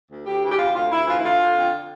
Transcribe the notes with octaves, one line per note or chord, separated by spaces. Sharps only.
D2
D2 G4
E3
G4
C3 F4
D2 F4
D2 E4
E3 F4
E4
D3 F4
D3
F2